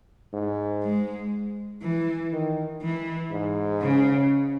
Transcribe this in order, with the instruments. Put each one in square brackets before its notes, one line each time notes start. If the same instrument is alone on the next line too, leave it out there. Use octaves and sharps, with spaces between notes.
[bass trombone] G#2
[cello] G#3
E3
[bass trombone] D#3
[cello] E3
[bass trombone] G#2
[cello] C#3